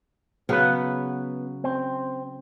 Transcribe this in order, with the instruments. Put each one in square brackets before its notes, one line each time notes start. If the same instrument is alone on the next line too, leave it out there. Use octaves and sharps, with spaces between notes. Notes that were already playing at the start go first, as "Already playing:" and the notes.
[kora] C#3 F#3 F#5 [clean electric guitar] B3 B4
[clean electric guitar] C4